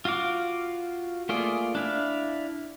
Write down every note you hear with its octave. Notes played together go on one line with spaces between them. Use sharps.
F4 F#4 F5 D6
A3 A#3 F4 G#4 D5
D4 E4 F5